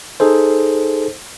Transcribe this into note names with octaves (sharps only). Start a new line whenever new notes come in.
D#4 G#4 A4 C5